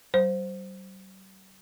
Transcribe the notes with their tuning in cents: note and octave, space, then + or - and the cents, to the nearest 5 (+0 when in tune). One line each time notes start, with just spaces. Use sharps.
G3 -45 C5 +0